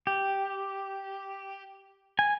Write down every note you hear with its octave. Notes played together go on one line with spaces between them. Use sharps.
G4
G#5